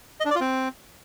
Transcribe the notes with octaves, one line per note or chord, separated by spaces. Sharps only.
D#5
D4
D5
F4
C4